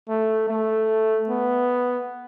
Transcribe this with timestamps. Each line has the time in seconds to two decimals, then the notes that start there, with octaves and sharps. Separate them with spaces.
0.09 A3
0.49 A3
1.29 B3